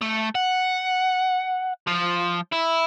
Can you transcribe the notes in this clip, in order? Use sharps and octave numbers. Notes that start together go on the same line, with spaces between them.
A3
F#5
F3
E4